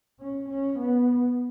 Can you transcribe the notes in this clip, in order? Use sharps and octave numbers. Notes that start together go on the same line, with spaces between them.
C#4
C#4
B3